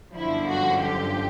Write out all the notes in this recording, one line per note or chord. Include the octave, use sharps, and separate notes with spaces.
G1 F#2 D3 F3 E4
F#4
G4